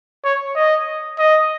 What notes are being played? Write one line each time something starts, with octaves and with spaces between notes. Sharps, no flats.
C#5
D#5
D#5